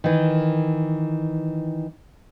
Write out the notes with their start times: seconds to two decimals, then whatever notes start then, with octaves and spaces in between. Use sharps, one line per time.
0.04 D#3 E3